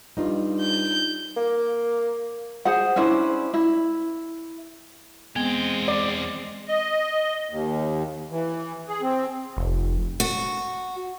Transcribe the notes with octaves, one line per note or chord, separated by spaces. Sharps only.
G2 D#4 F4
G6
A#3
G#4 C5 F#5
C#4 D4 E4 C5
E4
E2 G#3 B3 C4 G5
D5
D#5
D#2
E3
G#4
C4
F1
F#4